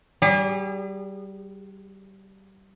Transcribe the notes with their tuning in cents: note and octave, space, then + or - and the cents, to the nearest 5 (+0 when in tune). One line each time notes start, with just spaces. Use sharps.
G3 -20 G#4 -45